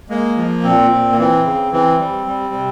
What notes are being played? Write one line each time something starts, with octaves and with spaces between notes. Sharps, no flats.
G#3 A#3
F3
A#2 C4
A#2
A#3
E3 C4
C#3
E3 C4
G3
G3
C3